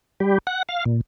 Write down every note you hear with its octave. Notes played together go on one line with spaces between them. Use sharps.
G3 G4
F#5
F5
A#2